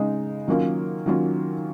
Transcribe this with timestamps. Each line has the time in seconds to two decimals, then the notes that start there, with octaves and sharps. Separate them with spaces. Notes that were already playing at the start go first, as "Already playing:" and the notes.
Already playing: C#3 G#3 D#4
0.48 D#3 F#3 A#3 C#4 F4
1.06 D#3 F#3 A#3 C#4 F4